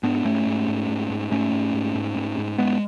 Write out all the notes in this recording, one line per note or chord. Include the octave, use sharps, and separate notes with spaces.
G#2 B3 D4
G#2 A3 C#4
G#2
G#2
G#2
G#2
G#2 A3 C#4
G#2
G#2
G#2
G#2
G#2
G#2 G#3 B3